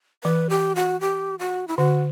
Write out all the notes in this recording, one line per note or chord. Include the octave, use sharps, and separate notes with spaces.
E3 B4
G4
F#4
G4
F#4
E4
D3 F#4